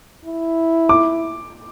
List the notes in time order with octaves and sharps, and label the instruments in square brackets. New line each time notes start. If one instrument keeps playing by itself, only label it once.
[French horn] E4
[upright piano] D6